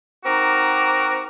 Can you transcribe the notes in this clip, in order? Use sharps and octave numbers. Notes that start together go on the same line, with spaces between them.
C4 D#4 F#4 A#4 D6